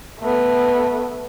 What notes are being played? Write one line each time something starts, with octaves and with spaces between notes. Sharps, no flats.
A3 B3